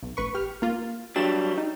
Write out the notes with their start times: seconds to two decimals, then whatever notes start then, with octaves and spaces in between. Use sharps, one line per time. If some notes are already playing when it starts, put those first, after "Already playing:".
0.03 B1
0.17 A1 B4 C#6
0.34 G4 F6
0.62 A#3 F4
1.16 F#3 G3 D4 E7
1.57 D#4